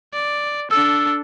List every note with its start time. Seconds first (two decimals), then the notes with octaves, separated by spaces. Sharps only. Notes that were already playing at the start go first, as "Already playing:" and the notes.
0.14 D5
0.71 D4 A4 E6